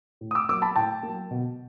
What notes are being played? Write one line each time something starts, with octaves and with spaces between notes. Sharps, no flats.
A2
D#6
D6 E6
F#3 A#3 D6 E6
A5 B5
A2 G5 A5
F#3 A#3
B2